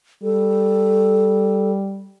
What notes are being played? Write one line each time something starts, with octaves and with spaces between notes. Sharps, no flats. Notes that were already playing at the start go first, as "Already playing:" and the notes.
G3 A4